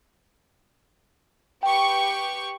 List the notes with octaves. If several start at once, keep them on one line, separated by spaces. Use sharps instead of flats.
G4 B4 G5 C#6